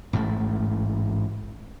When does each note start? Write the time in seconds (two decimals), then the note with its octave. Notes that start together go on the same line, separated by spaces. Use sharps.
0.13 A1 G#2 A3